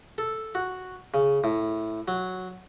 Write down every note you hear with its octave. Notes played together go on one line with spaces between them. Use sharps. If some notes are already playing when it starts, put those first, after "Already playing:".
A4
F#4
C#3
A2
F#3